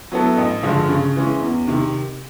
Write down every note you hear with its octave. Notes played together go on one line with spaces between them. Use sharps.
F#3 B3 E4 A4
A1
G2 D3 F3 G#3
C#3
E3 G#3 C#4
E2
C3 D#3